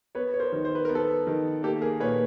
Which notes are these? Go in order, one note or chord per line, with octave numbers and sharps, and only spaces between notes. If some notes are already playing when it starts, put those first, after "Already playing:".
B3 B4 C#5
C#5
A#4 C5
D#3
C5
B4
B3 A#4
A4 B4
D#3
A#3 G4 A4
G#4 A#4
A#2 B4 C#5